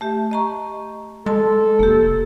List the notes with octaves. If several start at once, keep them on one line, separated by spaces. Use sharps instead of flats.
A3 G4 E5
D#5 A#5 C#6
G#3 A4 A5 C6
F1 A#3 G4